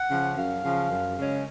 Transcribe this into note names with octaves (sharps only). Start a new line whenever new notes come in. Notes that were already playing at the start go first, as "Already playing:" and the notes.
Already playing: F#5
C#3 F3
F#2 F5
C#3 F3
F#2
C#3 G#3 C#4